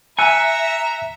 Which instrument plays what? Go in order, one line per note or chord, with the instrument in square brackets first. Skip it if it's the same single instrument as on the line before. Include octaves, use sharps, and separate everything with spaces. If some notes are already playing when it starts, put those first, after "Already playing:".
[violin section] E5 [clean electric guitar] G#5 [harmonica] A#5 [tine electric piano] E6 F#6 C#7